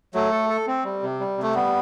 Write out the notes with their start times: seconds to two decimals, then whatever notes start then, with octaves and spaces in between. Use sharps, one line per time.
0.14 F#3 A3
0.32 A4
0.49 A4
0.67 C4
0.85 G3
1.03 C3
1.20 G3
1.38 C3
1.43 A3
1.55 G3 B3